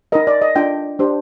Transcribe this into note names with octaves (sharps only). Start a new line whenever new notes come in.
D#4 A#4 D#5
D5
D#5
D4 F4 A4 G5
D4 G4 C5